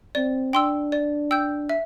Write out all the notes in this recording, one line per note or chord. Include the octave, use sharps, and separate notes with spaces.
C4 D5
D4 G5 C6 E6
D5
G5 E6 G6
E5